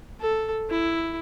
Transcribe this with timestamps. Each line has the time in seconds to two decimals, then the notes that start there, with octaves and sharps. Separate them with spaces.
0.21 A4
0.70 E4